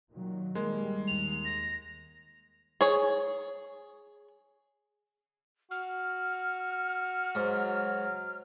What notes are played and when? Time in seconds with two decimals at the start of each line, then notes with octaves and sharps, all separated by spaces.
0.12 A#2 D#3 F#3
0.55 D#3 G3 G#3 A#3
1.08 D#2 F7
1.45 A#6
2.81 G#4 C#5
5.71 F#4 F6
7.35 G#2 F#3